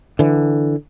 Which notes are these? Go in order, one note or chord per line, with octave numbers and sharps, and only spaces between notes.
D3 E3